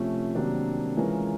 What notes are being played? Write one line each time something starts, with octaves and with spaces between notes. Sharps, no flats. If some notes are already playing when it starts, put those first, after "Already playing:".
Already playing: C3 F3 A3 C#4
C3 D#3 F#3 A#3 D4
E3 G#3 C#4 F4 A#4